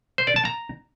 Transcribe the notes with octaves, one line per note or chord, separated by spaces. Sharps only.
C5
D5
A5
A#5